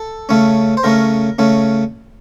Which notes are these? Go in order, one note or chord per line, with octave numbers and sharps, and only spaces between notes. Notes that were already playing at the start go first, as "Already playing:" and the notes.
Already playing: A4
C#3 A3 C#4
C5
C#3 A3 C#4 A#4
C#3 A3 C#4